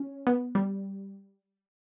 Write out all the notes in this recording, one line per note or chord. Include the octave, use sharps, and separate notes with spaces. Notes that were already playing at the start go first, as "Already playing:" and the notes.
Already playing: C#4
B3
G3